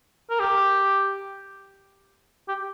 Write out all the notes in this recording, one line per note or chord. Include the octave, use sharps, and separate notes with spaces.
A#4
G4
G4